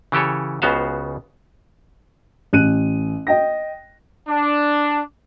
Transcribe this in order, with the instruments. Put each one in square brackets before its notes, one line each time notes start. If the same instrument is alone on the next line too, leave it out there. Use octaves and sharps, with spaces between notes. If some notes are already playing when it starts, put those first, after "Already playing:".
[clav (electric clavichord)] C#3 E3 G4 A4 C#5
C#2 C#3 B3 F#4 C5 F5
[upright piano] A1 F#6 D#7
D#5 G5 A#6
[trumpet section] D4